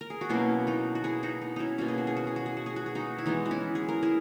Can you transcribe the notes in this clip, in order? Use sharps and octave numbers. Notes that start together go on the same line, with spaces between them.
A#4
G#4
F#4
B2 F#3 A#3 C#4 E4
D#4 F#4
F#4
E4 G#4
D#4 F#4
D#4
C#4 D#4 E4
B2 A#3 C#4 F#4
G#4
F#4
G#4
F#4
G#4
F#4
G#4
F#4
G#4
F#4
G#4
D#4 F#4
E4
E3 G#3 B3 D#4
F#4
C#4 E4
G#4
A#4
E4 G#4